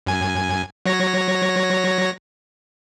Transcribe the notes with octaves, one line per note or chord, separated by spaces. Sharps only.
F#2 G#5
F#3 C#5 A#6